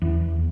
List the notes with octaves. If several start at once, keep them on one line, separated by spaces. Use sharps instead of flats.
E2